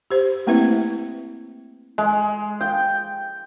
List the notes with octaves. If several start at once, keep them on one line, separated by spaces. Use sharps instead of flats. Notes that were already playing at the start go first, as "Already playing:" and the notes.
G4 C5
A3 A#3 C4 E4 B4 E5
G#3
G5